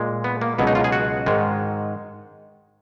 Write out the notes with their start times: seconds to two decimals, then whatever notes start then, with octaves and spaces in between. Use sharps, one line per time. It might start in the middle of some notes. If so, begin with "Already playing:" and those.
Already playing: A#2 G#3
0.24 B3
0.41 A#3
0.58 C#2 B2 F#3 B3
0.67 D#4
0.75 F4
0.84 G#4
0.92 F#4
1.26 G#2 D#3 G#3